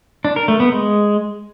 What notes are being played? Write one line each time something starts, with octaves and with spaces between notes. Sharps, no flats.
D4
A#4
A3
B3
G#3